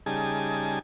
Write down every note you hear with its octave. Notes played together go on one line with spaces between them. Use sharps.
C#3 G3 D#4 G#4 G#5 A5